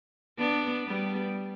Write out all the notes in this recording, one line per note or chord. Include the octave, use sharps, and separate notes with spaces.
B3 D4
G3 B3